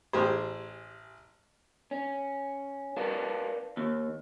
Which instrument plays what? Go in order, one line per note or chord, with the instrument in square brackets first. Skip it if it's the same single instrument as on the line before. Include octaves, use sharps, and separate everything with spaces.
[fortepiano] A1 G4 G#4 C5
[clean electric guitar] C#4
A#4 B4 D5 F5 A5
D#2